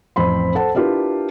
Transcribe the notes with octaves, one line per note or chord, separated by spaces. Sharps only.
A1 F2 C4 B5 C6
A4 C5 F#5 A5
D4 E4 F4 G4 A#4 B4